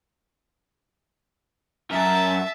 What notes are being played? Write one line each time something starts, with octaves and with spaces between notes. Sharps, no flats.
F#2 A#4 E5 A5